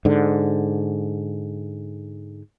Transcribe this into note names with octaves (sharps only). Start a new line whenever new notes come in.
G#2 D3